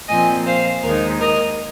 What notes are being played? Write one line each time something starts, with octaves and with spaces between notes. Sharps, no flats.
A#2 F3 C4 D#5 G#5
C5 F5
D#2 D#3 G#3 D#4 A#4
A#4 D#5